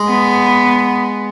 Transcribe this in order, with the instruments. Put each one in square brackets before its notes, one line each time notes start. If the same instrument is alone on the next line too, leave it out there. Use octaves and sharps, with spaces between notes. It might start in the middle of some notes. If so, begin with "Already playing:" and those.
Already playing: [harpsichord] G#3
[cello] B3